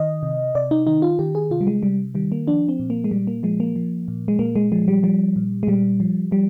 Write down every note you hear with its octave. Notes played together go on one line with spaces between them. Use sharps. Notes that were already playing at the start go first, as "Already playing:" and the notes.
Already playing: D#3 D#5
C3
C3 D5
D#4
D#3 D#4
F4
D#3 G4
G#4
C3 F4
G3
G#3
C3 G3
D#3 G3
A#3
F3 D4
C4
A#2
A#3
G#3
A#2 G3
A#3
F3 G#3
A#3
F3
A#2
G#3
A#2 A#3
G#3
F3 G#3
G3
F3 G3
A#2
G#3
A#2 G3
F3
F3 G3